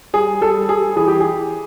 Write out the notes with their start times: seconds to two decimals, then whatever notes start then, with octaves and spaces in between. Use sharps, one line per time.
0.13 G3 G#4
0.41 G3 A4
0.68 G3 G#4
0.96 E3 G#4
1.08 G4
1.20 E3 G#4